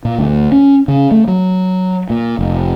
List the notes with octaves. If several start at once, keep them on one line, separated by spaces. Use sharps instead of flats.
A#2
D2
C#4
C#3
A3
F#3
A#2
F1